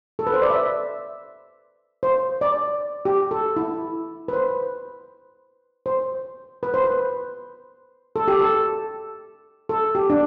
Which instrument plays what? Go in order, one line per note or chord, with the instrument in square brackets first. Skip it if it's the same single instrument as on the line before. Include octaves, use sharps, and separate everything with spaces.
[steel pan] A4
B4
C5
D5
E5
C5
D5
G4
A4
E4
B4
C5
C5
B4
C5
B4
A4
G4
A4
A4
G4
D4